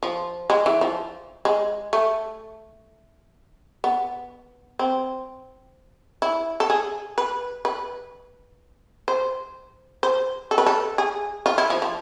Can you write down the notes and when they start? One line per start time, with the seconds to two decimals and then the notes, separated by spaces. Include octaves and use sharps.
0.03 F3
0.50 G#3
0.66 E3
0.81 F3
1.45 G#3
1.93 A3
3.84 B3
4.79 C4
6.22 E4
6.60 A4
6.70 G#4
7.18 B4
7.65 B4
9.08 C5
10.03 C5
10.51 A4
10.58 B4
10.66 A4
10.98 G#4
11.46 F4
11.58 E4
11.70 F3
11.82 F3